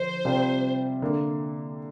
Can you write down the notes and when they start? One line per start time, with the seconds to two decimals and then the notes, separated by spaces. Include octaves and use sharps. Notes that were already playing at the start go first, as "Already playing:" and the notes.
Already playing: D3 F3 D4 C5
0.25 C3 G3 C4 F4
1.02 D3 A#3